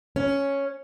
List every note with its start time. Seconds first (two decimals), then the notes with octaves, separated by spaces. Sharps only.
0.16 C#4